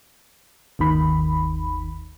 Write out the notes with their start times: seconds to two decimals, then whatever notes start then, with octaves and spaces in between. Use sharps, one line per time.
0.79 G1 D#2 D#3 B5